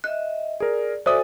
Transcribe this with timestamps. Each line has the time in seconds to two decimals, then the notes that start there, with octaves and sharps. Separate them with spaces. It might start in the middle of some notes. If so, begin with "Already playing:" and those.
0.04 D#5 E5 F#6
0.60 G#4 A#4 D5
1.06 F#4 A4 C5 D5 E5 G#5 D#6